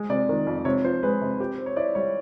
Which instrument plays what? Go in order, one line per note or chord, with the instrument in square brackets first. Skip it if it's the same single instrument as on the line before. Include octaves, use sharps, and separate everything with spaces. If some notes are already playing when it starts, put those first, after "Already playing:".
Already playing: [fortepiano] G#3
[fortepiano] C3 [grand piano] D5
[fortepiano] D#3
F2
[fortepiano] C3 [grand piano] C#5
[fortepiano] F3 [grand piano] C5
[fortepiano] G#3 [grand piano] B4
[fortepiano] C3
G4
C4
[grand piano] C#5
[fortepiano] E4 [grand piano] D5
[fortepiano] G3 [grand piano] C#5